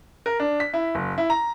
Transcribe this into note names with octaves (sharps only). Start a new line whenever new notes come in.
A#4
D4
B6
E4
F#1
E4
A#5